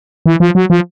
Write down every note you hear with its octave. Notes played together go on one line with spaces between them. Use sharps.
E3
F3
F#3
F3